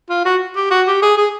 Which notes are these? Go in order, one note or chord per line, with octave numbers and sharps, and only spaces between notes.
F4
F#4
G4
F#4
G4
G#4
G#4